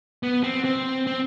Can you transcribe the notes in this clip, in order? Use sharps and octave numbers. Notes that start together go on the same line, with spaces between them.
B3
C4
C4
C4